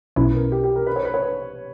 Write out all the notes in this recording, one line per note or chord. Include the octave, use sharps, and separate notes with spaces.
B1 B2 F#3 C#4 E4 B4
A#4
G4
G4
A#4
B4
C#5
B4
C#5